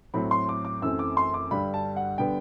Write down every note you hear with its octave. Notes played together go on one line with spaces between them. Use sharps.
A2 F#3 A3 C4 B5
C6
D6
D6
F#2 E3 A3 C4 E6
D6
C6
D6
G2 D3 G3 B5
A5
F#5
D3 G3 B3 G5